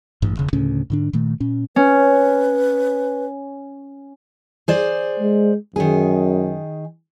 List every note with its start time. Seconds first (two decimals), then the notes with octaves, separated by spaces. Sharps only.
0.22 A1 G2
0.37 E1 C#3
0.53 D2 A2 C#3 C#4
0.90 G#2 D3 D4
1.13 A#2 D#3 A3
1.40 A#2 C#4
1.76 C#4 B4
4.68 G#4 C5 D5
5.20 G#3
5.76 F#2 D#3 G#4